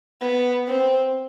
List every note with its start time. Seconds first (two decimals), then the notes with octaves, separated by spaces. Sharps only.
0.21 B3
0.67 C4